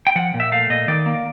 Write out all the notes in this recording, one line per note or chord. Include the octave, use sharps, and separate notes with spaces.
G5
F3 F#5
A#2
E5
A3 F5
A#2 D#5
D#3 D5
A#3